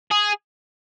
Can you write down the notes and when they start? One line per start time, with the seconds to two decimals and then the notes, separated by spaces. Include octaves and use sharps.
0.11 G#4